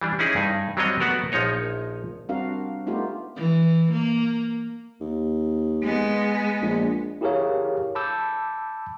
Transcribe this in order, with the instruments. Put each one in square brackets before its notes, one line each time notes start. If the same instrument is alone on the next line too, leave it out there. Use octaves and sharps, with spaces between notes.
[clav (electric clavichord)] E3 G3 D4
C#4 D#4 E4 G#4
G2 D#4 G#5
F#3 G3 C4 D4 C#5 D#5
A3 B3 F#4 A#4
A#1 F3 D#4 C#5 D#5
[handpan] G3 C4 D4 F#4 A#4 F5
A3 B3 D#4 F4 G4
[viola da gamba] E3
A#3
[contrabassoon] D#2
[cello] G#3 B3
[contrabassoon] A#1
[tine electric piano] E4 G4 G#4 A#4 C#5 F5
A5 B5 D6 E6 G6